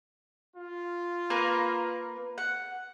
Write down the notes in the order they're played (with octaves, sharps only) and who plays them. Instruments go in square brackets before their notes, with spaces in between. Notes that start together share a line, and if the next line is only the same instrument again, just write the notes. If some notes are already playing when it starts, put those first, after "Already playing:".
[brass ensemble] F4
[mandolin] A#3 A#4 B4
F#5